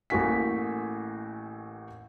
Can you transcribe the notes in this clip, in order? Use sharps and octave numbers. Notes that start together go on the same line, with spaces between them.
A1 A2 A#3 F#4 G#5 B6